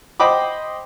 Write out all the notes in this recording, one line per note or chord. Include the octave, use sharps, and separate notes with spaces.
C5 D#5 G5 B5 D6